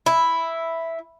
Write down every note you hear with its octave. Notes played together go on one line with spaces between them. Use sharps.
E4